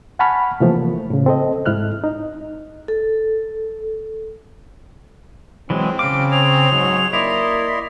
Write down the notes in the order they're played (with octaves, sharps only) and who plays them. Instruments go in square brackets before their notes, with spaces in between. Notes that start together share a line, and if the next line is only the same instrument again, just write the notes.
[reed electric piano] F#5 G#5 A5 B5 C#6 F6
C3 E3 F3 A3 A#3
A2 C#3
C4 A4 D#5
G#2 E4 F6 F#6
D#4
[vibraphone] A4
[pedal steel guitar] E3 F#3 G#3 [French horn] C4
[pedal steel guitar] C#3 D6 [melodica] F5 [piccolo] D7
[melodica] G#4 C#5 C6 [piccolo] F7
[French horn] G#2 [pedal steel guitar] F#3
[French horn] A#3 [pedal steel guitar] E4 [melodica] D5 D#5 C6